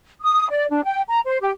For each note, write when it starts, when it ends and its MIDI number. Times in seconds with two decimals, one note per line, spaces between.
0.22 0.46 87
0.50 0.65 74
0.69 0.81 62
0.84 1.01 79
1.08 1.19 82
1.25 1.37 72
1.41 1.50 67